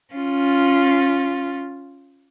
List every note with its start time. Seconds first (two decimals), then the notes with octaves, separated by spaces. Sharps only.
0.14 C#4 F4